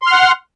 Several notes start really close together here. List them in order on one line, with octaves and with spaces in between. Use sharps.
C6 F6 F#5